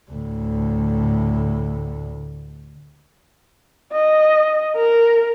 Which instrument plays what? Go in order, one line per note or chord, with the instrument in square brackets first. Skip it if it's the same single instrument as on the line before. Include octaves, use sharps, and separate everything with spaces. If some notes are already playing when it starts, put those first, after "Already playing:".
[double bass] D2 A2
[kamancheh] D#5
A#4